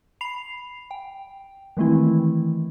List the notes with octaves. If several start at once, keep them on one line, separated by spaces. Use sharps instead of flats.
B5 C7 F7
G5
D#3 E3 G#3 A3 C4 E4